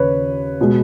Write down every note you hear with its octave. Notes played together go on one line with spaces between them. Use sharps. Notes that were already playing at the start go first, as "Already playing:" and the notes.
Already playing: D#2 C#3 B4 C#5
B2 G#3